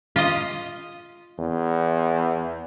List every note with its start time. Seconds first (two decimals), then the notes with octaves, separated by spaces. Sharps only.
0.16 F4 D#5
1.39 E2